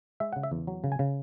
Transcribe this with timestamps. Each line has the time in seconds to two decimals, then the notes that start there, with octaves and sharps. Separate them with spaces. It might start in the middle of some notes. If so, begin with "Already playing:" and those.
0.20 G#3 E5
0.33 C#3 F#5
0.43 E5
0.52 E2
0.67 F#3
0.84 C#3
0.92 G#5
0.99 C#3